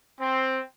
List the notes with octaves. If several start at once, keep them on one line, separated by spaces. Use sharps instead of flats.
C4